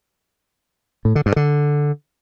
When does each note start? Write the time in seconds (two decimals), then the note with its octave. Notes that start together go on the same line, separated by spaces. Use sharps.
1.05 A2
1.15 D3
1.26 G2
1.36 D3